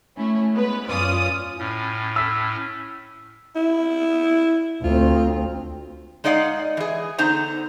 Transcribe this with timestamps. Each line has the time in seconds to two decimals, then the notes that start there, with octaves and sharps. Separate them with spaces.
0.17 A3 C#4 E4
0.52 G#3 B3 B4
0.88 F#2 C#4 F4 D5 D#6
1.58 A2 C#4
2.16 E6 B6
3.56 E4
4.84 D2 C4 F4
6.24 G#3 D#4 D5 D#5 F5 F#5
6.77 E3 G#4
7.18 D3 B3 D#4 C5 A#5